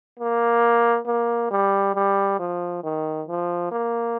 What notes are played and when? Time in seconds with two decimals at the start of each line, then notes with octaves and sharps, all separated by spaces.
0.19 A#3
1.06 A#3
1.51 G3
1.95 G3
2.39 F3
2.83 D#3
3.28 F3
3.72 A#3